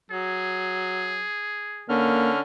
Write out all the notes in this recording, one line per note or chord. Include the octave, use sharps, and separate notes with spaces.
F#3 G#4
D3 A#3 C#4 F6